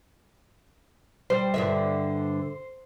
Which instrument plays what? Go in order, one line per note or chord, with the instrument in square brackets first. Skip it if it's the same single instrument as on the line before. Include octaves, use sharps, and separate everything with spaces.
[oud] G3 [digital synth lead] C5
[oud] G2 D3 E5